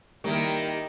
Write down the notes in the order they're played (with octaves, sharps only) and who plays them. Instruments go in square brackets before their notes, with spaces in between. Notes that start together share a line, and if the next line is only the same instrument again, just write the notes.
[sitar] D#3 [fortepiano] G3 A#3 [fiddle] E4 A#4 [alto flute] G4